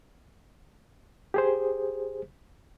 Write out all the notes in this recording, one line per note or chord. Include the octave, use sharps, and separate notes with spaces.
G4 G#4 C5